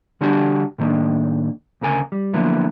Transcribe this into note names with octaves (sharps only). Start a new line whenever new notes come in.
D3 G3 D4 F#4 G4 A5
A2 D#3 A#3 D4
D2 C#3 A#4 G#5
G3
D3 F3 F#3 A#3 B3 E4